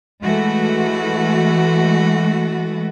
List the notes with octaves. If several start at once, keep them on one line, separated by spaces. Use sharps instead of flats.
E3 G#3 A3 F#4